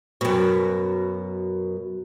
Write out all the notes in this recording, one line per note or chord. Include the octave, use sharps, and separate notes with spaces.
F#2 B2